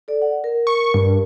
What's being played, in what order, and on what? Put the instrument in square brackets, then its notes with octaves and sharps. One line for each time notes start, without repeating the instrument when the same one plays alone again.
[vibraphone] A4 D5
F#5
A#4
[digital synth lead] C#6
G2